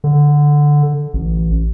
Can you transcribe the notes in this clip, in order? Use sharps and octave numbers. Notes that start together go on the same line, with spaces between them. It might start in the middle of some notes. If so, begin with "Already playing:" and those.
D3
A1